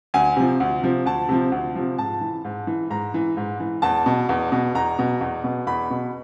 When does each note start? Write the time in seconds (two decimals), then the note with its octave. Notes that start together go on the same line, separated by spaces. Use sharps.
0.14 D2 G#5
0.36 C3 F3
0.60 D2
0.83 C3 F3
1.06 D2 A5
1.29 C3 F3
1.52 D2
1.75 C3 F3
1.98 G#2 A5
2.21 E3
2.45 G#2
2.67 E3
2.90 G#2 A#5
3.14 E3
3.37 G#2
3.60 E3
3.82 E2 A5
4.06 B2
4.29 E2
4.52 B2
4.75 E2 A#5
4.99 B2
5.21 E2
5.44 B2
5.67 E2 B5
5.90 B2